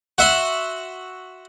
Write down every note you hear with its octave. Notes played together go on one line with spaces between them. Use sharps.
F#4 E5 C6